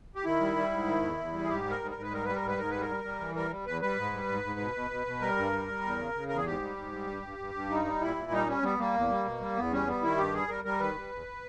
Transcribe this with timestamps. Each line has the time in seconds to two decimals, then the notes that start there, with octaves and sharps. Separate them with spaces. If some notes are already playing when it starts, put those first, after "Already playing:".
0.15 G4
0.25 D#3 E4
0.40 G3
0.56 G3
0.71 G#2
0.87 D#3
1.02 E2
1.18 E2
1.33 G3
1.44 G#4
1.49 G#2 G4
1.65 G3
1.70 A#4
1.80 G#2
1.91 G#2 A#4
2.02 B4
2.11 G3 A#4
2.24 G3 B4
2.35 A#4
2.42 G#2
2.47 B4
2.57 G#2 A#4
2.70 G3 B4
2.81 A#4
2.89 G3
3.04 G3
3.20 E3
3.35 G3 A#4
3.51 G3
3.66 E2 B4
3.81 G3 B4
3.97 G#2
4.13 G3
4.28 G#2
4.44 G#2
4.59 B2
4.75 B2
4.91 B2
5.06 B2
5.21 G3 A#4
5.37 G2
5.52 G3
5.68 G3
5.83 E2
5.99 C#3
6.14 C#3
6.28 E2 A#4
6.36 G#4
6.45 G#2 G4
6.61 G3
6.77 G#2
6.92 G3
7.07 G2
7.23 G2
7.38 G2
7.54 G2
7.70 G3 D#4
7.85 G3
8.01 A#2 E4
8.16 A#2
8.32 G3 D#4
8.47 G3 C#4
8.63 G3 B3
8.78 G3 A#3
8.94 E2
9.10 G3
9.25 B2
9.41 G3
9.56 E2 B3
9.71 G3 C#4
9.87 G3 B3
10.03 D#3 E4
10.18 G2 G4
10.34 G3 G#4
10.49 G3 A#4
10.65 G3 A#4
10.80 D#3 B4
10.95 G3
11.11 E2